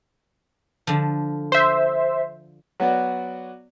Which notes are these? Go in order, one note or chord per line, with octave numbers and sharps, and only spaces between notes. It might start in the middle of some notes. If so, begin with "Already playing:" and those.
D3 F3
C5 E5
F#3 B3 F#4 D5